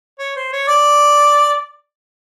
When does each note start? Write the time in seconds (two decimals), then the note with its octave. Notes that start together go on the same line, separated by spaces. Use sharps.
0.19 C#5
0.36 C5
0.53 C#5
0.68 D5